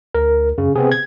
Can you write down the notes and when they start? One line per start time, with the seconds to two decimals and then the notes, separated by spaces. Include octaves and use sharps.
0.15 D2 A#4
0.58 F#2 C#3
0.76 C3 B3 C4 G#4
0.92 G#6